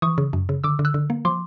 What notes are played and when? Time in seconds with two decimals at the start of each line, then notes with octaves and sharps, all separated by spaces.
0.02 E3 C#6 D#6
0.18 C#3
0.33 F#2
0.49 C#3
0.64 D3 D6 E6
0.79 D3
0.85 E6 F#6
0.94 D3
1.10 A#3
1.25 F3 C6 D6